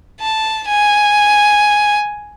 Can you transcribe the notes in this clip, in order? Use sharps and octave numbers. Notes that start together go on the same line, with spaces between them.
A5
G#5